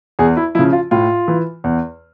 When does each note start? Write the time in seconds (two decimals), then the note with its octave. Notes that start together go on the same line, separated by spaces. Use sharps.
0.19 E2 G#4
0.37 E4
0.55 C#3 F3 E4
0.73 F4
0.91 A2 F4
1.28 E3
1.64 E2